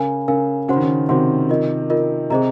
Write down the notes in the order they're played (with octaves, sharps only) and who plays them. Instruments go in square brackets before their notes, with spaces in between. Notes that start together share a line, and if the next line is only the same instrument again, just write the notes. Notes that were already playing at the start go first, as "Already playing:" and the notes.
Already playing: [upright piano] C#3 [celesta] A#4 F5 G#5
[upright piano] C#3 [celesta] A#4 F5 G#5
[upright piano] C#3 [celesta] F#4 C5 F#5 C6
[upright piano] D#3
C#3
[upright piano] C3 D#3 [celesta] F#4 C5 F#5 C6
[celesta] F4 A#4 D#5
F4 A#4 D#5
[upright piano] C3 [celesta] G#4 C5 D#5 A#5